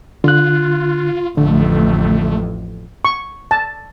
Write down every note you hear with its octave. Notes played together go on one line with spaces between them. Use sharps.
D3 F4 F#6
A1 F2 D3 A3
C#6
A5